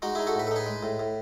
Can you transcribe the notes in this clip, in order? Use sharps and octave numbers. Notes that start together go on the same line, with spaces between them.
G#3 D#4 F#4
D#4 E4 G#4
F#4 A4
A2 B4
A4
D#4 G#4 B4
G#3
A2
A2